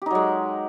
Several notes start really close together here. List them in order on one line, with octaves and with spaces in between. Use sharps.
G4 D#4 F#3 G#3